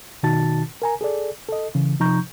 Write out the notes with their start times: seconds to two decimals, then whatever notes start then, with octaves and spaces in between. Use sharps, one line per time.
0.23 B2 D#3 D#4 F#4 A5 A6
0.82 A#4 G#5 A#5
1.01 G#4 A4 D5
1.49 A4 D#5
1.75 C#3 E3
2.00 C3 F3 D#4 A#5 C#6 G6